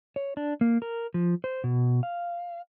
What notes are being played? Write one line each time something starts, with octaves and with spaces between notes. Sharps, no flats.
C#5
D4
A#3
A#4
F3
C5
B2
F5